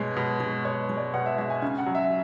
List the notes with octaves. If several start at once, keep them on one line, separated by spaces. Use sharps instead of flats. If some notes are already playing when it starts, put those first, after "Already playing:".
Already playing: B2 G#3 C#5
B2
G#3
B2 C#5
G#3
D5
B2 F#5
E5
G#3 E5
G#5
C#3 G#5
F#5
F#3
E5